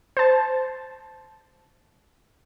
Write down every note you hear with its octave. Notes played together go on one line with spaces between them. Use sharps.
C5 A5